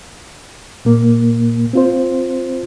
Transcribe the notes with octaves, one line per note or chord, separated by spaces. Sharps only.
A#2 A#3
C4 F4 C5